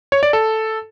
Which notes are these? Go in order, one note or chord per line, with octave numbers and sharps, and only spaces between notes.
C#5
D5
A4